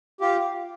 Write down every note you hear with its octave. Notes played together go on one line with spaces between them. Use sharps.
F4 G4